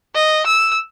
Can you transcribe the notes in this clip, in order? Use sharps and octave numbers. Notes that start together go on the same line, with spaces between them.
D#5
E6